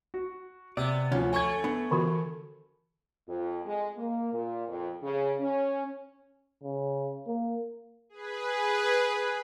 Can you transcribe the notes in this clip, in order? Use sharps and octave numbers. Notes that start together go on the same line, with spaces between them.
F#4
C3 B3 D5
D2 F3 C#4
A3 G#5 C#6 G#6
B3 D4
D3 E3 F#4
F2
G#3
A#3
A#2
F2
C#3
C#4
C#3
A#3
G#4 B4